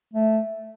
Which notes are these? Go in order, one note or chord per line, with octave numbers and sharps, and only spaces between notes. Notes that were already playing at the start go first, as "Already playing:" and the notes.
A3